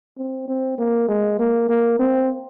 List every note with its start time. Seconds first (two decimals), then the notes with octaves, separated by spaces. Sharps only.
0.17 C4
0.48 C4
0.78 A#3
1.08 G#3
1.39 A#3
1.69 A#3
1.99 C4